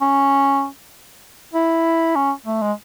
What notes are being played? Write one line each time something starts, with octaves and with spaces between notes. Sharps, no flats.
C#4
E4
C#4
A3
G#3